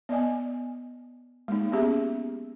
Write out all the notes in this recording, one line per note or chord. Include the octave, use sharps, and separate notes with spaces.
B3 D5 D#5 G#5
G#3 A#3 D#4
B3 C#4 G4 G#4 E5